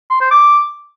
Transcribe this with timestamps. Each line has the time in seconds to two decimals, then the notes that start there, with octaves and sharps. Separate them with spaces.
0.10 C6
0.21 C5
0.31 D6